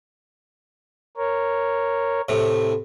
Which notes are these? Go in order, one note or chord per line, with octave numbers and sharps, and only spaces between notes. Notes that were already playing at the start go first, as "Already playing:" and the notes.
A#4 C#5
A2 C3